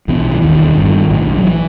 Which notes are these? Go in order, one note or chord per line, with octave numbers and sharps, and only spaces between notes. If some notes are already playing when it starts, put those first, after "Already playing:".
B1 B2 E3
E3
E1 D#2 D#3
G1 G2
B1 A2
F#3
E3